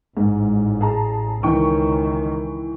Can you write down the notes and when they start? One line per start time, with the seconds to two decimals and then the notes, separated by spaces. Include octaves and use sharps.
0.17 A1 G#2
0.81 G#4 A5 A#5
1.43 C#2 D#3 E3 G5 C#6